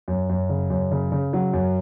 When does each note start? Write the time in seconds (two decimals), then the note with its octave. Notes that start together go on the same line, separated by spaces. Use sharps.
0.08 F#2
0.29 F#2
0.49 C#3
0.70 F#2
0.91 C#3
1.12 C#3
1.33 F#3
1.53 F#2